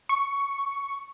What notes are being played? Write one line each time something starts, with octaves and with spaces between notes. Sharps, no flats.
C#6